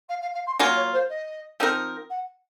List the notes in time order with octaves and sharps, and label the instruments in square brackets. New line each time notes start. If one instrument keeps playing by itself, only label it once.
[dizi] F5
F5
F5
C6
[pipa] F#3 A#3 F4 [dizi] G#5
[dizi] C#5
C5
D#5
[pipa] F3 C4 D#4 A#4
[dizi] F#5